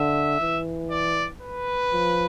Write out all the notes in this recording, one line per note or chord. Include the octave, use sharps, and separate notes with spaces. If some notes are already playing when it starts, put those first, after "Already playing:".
Already playing: D3 E5
E3
D5
B4
F3